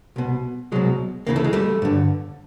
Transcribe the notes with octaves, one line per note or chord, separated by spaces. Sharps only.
C2 B2
C2 B2 F#3 G#3
D2 C#3 E3 A#3
A3
G#3
G3 A3
G2 D3